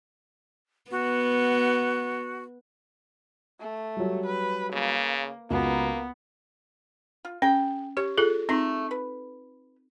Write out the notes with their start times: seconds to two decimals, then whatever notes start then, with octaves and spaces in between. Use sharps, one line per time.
0.91 B3 F#4
3.60 A3
3.97 F#3 G3
4.26 B4
4.73 C#3 A#3
5.51 C#2 A#3 B3 F#4 A#5
7.25 F4
7.42 C#4 G#4 G5
7.97 G4 C#5
8.18 F4 G#4 A4
8.49 A3 C4 D#4
8.91 B4